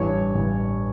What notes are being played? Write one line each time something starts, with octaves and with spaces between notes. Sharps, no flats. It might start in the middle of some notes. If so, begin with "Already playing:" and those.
Already playing: A1 G2 E3 C#5
A1 G2 E3